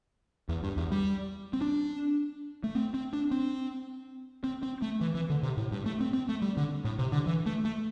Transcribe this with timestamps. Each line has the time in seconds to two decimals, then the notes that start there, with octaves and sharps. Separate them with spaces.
0.49 E2
0.63 G2
0.77 E2
0.91 G3
1.53 C4
1.61 D4
2.64 A3
2.75 C4
2.94 C4
3.13 D4
3.31 C4
4.44 C4
4.63 C4
4.82 A3
5.01 E3
5.15 E3
5.30 D3
5.43 C3
5.57 A2
5.71 G2
5.86 A3
6.00 C4
6.13 C4
6.29 A3
6.42 G3
6.57 D3
6.85 A2
6.99 C3
7.12 D3
7.27 E3
7.46 A3
7.65 A3